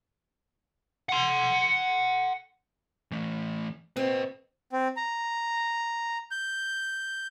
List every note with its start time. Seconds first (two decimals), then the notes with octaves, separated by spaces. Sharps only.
1.09 F#5 C6
3.12 E3 A3
3.97 C4 B4 D#5
4.73 C4
4.97 A#5
6.31 G6